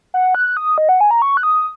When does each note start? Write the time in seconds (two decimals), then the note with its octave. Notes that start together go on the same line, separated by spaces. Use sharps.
0.14 F#5
0.35 F#6
0.57 D#6
0.78 D#5
0.89 F#5
1.01 G#5
1.11 A#5
1.22 C#6
1.37 F#6
1.43 D#6